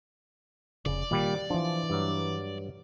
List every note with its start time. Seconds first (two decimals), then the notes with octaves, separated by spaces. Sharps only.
0.86 F1 C#3 D5
1.11 A#2 D#3 G3
1.50 E3 F3 D4
1.90 G2 F#3